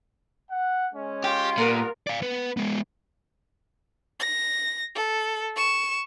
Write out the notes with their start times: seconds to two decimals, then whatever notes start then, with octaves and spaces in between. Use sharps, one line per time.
0.49 F#5
0.94 G#3 C#4
1.24 F4 G4
1.58 A#2 G3 B3 A#4
2.07 D5 F5
2.22 B3 B4
2.57 G#3 B3
4.20 A#6
4.95 A4
5.56 C#6 E7